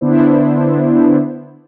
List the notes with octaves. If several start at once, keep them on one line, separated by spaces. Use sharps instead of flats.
D3 B3 D4 E4 C5